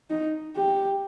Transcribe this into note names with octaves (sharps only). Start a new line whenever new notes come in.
D#4
G4